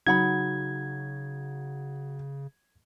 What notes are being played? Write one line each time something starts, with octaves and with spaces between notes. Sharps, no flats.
C#3 F#3 D#4 F#5 B5 G#6